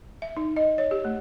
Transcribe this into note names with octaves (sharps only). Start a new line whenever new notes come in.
E5
D#4
D#5
C#5
G4
A3